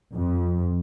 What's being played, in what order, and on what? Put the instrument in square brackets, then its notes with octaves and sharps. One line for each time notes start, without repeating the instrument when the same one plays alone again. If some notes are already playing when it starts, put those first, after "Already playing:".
[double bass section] F2